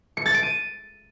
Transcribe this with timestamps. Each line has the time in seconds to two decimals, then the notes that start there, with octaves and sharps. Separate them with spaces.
0.17 C#7
0.26 A6
0.34 D7
0.43 D#7